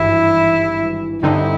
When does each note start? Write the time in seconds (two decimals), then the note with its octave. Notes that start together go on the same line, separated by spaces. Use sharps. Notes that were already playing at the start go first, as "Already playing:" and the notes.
Already playing: G#1 G2 E3 E4
1.23 G2 D3 G3 C4 D#4 E4